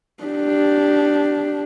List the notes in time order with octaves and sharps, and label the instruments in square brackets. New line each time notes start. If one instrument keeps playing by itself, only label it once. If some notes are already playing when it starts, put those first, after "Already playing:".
[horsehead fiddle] D4 G4